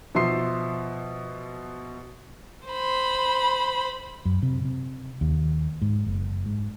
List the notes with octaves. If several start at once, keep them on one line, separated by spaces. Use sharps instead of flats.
B2 F3 E5 C6 C7
C5 B5
F#2
C3
C3
D#2
G#2
F#1
G#2